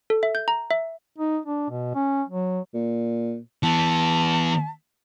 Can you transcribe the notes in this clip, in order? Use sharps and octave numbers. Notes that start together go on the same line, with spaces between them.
A4
E5
G6
A#5
E5
D#4
D4
B2
C#4
F#3
A#2
E3 B3 A5